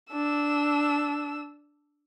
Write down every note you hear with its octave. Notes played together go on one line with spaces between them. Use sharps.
D4 E6